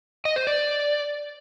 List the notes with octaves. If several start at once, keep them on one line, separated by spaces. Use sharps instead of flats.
D#5
C5
D5